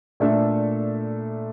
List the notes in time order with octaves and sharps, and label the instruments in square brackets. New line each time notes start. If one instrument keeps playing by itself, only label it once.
[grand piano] A#2 A3 D4 A4 E5